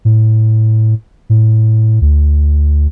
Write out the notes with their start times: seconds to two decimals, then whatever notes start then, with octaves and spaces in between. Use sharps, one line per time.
0.05 A2
1.30 A2
2.01 D2